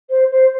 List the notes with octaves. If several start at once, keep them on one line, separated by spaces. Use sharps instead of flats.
C5
C5